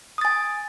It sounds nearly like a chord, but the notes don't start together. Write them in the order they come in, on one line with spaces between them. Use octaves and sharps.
D#6 A6 G#5